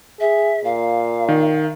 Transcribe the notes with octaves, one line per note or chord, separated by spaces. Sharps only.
G#4 E5
A#2 F5
D#3